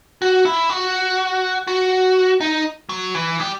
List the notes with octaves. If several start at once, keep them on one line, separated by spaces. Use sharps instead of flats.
F#4
E4
F#4
F#4
D#4
F#3
E3
G3